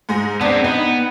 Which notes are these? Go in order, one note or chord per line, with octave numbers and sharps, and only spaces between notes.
G#2 G#3 A#6
B3 C4 D4 D5 G#6
B3 D#4